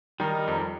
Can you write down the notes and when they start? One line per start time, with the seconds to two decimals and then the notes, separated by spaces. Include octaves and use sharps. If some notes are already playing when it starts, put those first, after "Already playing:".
0.20 D#3 G3 D#4 A#4
0.48 F2